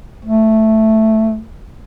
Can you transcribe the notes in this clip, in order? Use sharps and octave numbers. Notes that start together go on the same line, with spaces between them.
A3